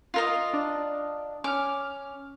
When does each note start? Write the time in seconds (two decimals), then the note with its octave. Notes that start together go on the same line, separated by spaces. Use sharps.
0.14 F4 A#4 D#5
0.53 D4
1.44 C#4 D6 F6